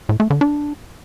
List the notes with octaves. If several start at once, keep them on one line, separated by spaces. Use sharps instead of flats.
A2
A3
D3
D4